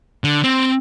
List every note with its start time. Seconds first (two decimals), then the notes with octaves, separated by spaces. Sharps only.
0.24 D3
0.44 C4